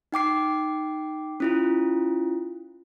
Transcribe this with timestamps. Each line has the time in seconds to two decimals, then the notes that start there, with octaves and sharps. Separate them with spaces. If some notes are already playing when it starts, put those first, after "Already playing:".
0.12 D#4 G5 D6 C7
1.40 C#4 E4 F4